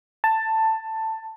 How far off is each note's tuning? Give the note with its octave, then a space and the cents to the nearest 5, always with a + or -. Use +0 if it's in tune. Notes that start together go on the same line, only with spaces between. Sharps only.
A5 +10